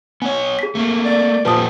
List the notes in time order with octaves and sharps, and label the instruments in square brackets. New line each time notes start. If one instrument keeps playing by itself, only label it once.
[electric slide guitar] B3 C#5 [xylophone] G#5
[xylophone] G#4 B6
[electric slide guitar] A3 A#3
[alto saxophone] D5
[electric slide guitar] A#2 A3 G4 [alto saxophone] F3 [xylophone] B4 A5 D#6